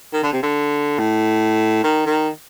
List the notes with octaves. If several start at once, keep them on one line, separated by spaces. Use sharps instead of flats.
D#3
D3
C3
D3
A2
D#3
D#3